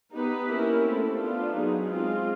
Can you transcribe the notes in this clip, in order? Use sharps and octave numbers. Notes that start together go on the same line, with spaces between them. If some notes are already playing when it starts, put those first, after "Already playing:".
B3 D#4 G4 B4
A#3 C#4 E4 G4 A#4
A3 C4 E4 A4
B3 D4 F4
F#3 B3 D#4 G#4
G#3 C4 F4